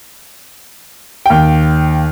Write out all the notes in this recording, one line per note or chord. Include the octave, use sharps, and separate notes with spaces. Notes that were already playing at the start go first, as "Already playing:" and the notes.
D#2 G5